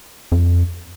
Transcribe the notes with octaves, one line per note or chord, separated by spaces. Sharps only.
F2